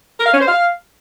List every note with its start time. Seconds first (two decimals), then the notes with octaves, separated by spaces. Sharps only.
0.19 A#4
0.26 F5
0.33 C#4
0.40 C5
0.48 F5